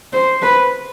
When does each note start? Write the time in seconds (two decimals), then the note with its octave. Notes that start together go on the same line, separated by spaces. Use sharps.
0.13 C5
0.42 B4